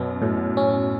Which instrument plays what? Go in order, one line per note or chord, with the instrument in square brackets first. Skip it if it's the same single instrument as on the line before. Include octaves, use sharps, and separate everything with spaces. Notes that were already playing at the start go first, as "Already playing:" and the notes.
Already playing: [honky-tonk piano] F#2 B2 [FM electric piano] B3
[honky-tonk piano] F#2 [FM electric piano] A2
[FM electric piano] C#4